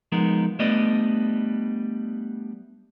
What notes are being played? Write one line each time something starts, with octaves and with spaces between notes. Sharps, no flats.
F3 G#3 B3 D#4 A#4
G3 A3 B3 D4 D5 D#5